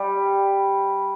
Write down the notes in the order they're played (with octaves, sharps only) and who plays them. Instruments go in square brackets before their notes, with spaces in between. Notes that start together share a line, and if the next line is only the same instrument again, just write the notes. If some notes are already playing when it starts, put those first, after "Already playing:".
Already playing: [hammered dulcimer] G3